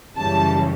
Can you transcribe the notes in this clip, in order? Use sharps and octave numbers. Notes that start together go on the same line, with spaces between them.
F#2 C#3 E3 G3 A5